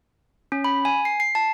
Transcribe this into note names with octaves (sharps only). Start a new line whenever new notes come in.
C#4
B5
G#5
C7
C7
A5